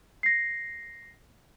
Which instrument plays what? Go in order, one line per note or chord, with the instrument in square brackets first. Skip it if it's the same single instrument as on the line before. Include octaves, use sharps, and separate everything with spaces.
[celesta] A#6 C7